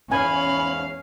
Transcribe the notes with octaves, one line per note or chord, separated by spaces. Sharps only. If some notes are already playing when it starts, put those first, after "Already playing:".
E2 G#2 C#4 F5 G#5 B5